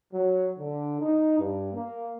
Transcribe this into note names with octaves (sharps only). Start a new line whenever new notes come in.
F#3
D3
D#4
G2
A#3